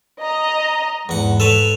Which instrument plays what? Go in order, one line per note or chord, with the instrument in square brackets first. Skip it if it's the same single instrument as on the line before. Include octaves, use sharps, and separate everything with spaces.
[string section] D#5 A#5
[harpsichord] E2 F#5 [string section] G#2
[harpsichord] A4 B4 C#5